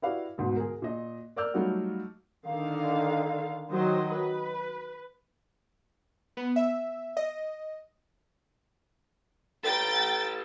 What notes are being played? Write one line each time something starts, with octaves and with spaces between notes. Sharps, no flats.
E4 F#4 G4 B4 D5 F5
D2 G#2 B2
G#4 A#4
A#2 D#5
A#4 D5 D6 E6 F6 G6
F#3 G3 A3 D#4 F4 F#4
D3 D#3 F5
D#3 F#3 C5 D#5
B4
B3
E5
D#5
A4 B4 G5 A6